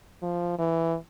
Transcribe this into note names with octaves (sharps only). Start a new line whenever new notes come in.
F3
E3